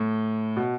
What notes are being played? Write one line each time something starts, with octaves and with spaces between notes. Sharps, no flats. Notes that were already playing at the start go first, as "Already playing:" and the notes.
Already playing: A2
B2